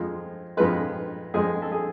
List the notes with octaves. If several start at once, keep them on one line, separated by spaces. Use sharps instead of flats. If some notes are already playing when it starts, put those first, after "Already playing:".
Already playing: F2 F3 G#3
F2 F3 G#3 B4
F2 F3 G#3 G#4
A4
G#4